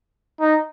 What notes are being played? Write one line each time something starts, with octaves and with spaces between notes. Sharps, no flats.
D#4